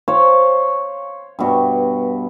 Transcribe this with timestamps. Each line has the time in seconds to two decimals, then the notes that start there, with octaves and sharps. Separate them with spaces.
0.08 C5 C#5 F5
1.39 G2 B2